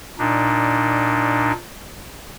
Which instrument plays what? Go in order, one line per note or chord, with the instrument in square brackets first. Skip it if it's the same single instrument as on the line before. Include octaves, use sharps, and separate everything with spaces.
[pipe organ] A#2 D4 D#4